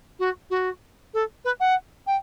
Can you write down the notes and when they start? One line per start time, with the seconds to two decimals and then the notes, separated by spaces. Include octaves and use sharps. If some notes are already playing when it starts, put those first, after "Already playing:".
0.19 F#4
0.50 F#4
1.14 A4
1.45 B4
1.60 F#5
2.07 G5